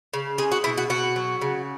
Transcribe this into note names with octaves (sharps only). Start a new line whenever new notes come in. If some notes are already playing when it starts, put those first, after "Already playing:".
C#3
G#3 G#4
F#4
B2 E4
F#4
B2 F#4
F#3
C#3